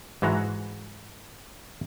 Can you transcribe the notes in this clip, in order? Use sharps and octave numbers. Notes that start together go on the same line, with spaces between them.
G#2 E3 G#3 F#4 A#5